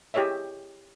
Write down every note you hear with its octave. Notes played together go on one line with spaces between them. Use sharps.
E4 G4 G#4 C#5 D#5 E5